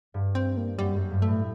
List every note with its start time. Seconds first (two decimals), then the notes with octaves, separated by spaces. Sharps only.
0.14 G2
0.35 C4
0.57 A#3
0.78 F#2 G3
0.95 F#2
1.11 G2
1.22 A3
1.28 A2